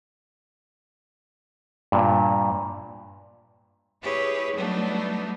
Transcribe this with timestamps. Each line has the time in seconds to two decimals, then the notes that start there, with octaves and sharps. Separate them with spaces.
1.92 G2 A#2
4.02 E4 G4 G#4 B4 C#5
4.54 F#3 G3 A3 B3 D4 D#4